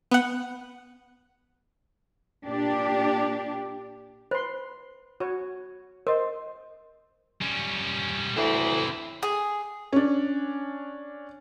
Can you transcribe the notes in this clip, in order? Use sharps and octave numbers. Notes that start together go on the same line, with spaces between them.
B3 F#5
A#2 D4 G4
B4 C5 C6
F#4 C#5
A#4 C5 D#5
G3 C#4
D2 A2 E3 C4 E4
G#4
C#4 D4